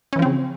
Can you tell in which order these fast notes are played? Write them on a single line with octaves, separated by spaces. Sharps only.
C#4 E3 F3 C4 C#3